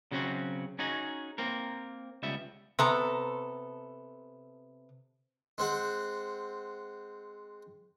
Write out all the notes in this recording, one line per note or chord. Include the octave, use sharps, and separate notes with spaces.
C#3 F#3 C4 C#4 F#4
C#4 D#4 F#4 G#4
A#3 C4 A#4
C#2 G3 B3 E5
C3 B3 A4 A#5
G#3 C4 F#5